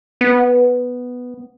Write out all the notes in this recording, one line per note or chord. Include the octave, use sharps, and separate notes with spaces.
B3